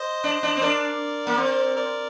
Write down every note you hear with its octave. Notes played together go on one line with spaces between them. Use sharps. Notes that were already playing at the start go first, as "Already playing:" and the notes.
Already playing: C5 D#5
D4
D4
C4
D4 A#4 D5
A#3
C4
A#4 D5